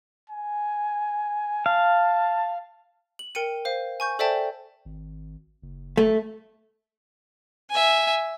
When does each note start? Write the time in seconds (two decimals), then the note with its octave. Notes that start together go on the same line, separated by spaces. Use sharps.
0.29 G#5
1.66 F5 A5
3.19 F#7
3.35 A#4 G5 C#7 D#7
3.65 C5 F5
4.00 G#5 C#6 G6
4.19 A4 C5 D5 E5 G5 A5
4.85 G#1
5.62 F#1
5.97 A3
7.70 E5 G#5